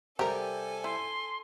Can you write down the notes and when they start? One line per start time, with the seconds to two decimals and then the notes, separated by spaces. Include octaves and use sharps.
0.19 C3 G3 G4 A4 A#4 G#5
0.84 E4 C6